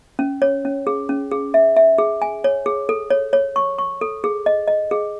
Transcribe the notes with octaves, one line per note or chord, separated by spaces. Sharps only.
C#4
C#5
C#4
G#4
C#4
G#4
E5
E5
G#4
G#5
C#5
G#4
A4
C#5
C#5
C#6
C#6
A4
G#4
D#5
D#5
G#4